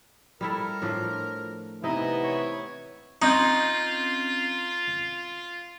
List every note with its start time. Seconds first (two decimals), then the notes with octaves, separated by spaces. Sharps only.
0.41 G3 E4 A4 A#4
0.82 A2 F3 D4
1.84 C3 E3 B3 D#4 E4 D#5
2.24 C#5
3.22 C4 C#4 D#4 F4 F#7